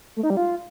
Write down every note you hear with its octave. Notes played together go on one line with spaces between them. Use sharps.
A3
D#4
G3
F4